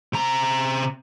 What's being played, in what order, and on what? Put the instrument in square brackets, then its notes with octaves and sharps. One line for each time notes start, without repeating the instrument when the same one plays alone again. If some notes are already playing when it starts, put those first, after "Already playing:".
[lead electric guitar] C3 A#5